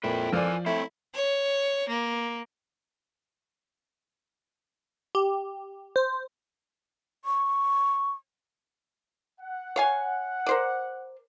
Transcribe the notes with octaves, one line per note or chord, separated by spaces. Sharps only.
F2 A#2 E4 B4 G5
E3 F3 A#4 D5 G#5
A3 C4 E4 C5 C#5
C#5
A#3
G4
C5
C#6
F#5
C#5 F5 G#5
A#4 C5 D5